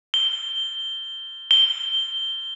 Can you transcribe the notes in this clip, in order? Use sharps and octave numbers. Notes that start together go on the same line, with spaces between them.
G7
G7